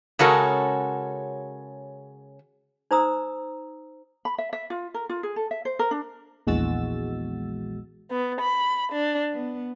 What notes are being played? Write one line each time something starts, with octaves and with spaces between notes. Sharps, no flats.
C#3 G#3 C#4 F#4 A4 A#4
D#4 C5 A#5 D#6 E6
B5
E5
E5
F4
A#4
F4
G#4
A4
E5
C5
A#4
D4
A#1 E2 G#3 F#4 E6 A6
B3
B5
D4
B3